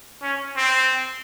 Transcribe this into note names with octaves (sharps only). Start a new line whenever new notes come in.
C#4
C4